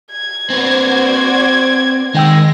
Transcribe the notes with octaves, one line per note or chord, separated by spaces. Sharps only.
G#6
C4 F#4 B4 C5 D5
D#3 G#3 G5 E6 A#6